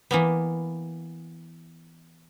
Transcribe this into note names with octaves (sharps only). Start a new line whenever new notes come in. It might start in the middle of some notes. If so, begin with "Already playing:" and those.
E3 A#3 B3